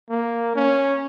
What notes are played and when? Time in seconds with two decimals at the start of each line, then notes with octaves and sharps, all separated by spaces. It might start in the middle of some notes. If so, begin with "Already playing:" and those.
0.10 A#3
0.55 C#4